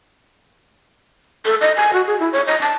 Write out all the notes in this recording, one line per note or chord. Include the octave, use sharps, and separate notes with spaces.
A4
D#5
G#5
F#4
G#4
E4
C#5
D#5
A5